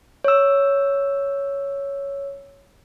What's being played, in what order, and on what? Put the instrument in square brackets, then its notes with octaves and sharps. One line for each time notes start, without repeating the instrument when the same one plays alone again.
[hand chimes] C#5 E6